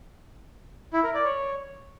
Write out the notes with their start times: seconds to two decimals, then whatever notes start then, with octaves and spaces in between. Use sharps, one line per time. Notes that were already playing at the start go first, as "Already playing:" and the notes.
0.93 E4
1.04 A#4
1.14 D5
1.24 C#5